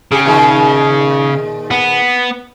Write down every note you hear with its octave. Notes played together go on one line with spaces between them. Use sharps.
C#3 G4 G#4
A#2 D#3 G#4
B3